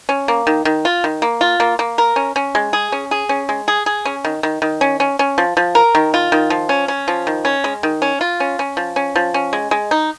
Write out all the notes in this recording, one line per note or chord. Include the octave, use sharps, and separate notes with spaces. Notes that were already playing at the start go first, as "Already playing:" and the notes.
C#4
A#3
D#3
D#3
F4
D#3
A#3
F4
A#3
A#3
A#4
C#4
C#4
G#3
G#4
C#4
G#4
C#4
G#3
G#4
G#4
C#4
D#3
D#3
D#3
C#4
C#4
C#4
F3
F3
A#4
D#3
F4
D#3
F3
C#4
C#4
F3
D#3
C#4
G#3
D#3
C#4
F4
C#4
C#4
F3
C#4
F3
C#4
G#3
G#3
D#4